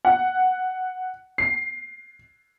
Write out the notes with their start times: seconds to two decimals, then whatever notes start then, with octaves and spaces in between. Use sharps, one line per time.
0.05 F#5
1.38 C7